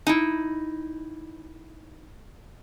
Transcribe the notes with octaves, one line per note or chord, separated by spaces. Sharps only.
D#4 E4